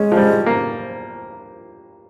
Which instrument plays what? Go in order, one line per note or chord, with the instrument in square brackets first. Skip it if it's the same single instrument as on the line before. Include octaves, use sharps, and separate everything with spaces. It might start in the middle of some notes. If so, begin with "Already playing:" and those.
Already playing: [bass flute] G#3 [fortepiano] C#4
[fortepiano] F3
G3
A#3